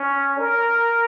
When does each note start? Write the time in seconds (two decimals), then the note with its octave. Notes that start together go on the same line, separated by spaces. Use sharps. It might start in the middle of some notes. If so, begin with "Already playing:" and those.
Already playing: C#4
0.39 A#4